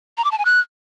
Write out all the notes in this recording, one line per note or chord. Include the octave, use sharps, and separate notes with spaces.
A#5
D6
A5
G#5
F#6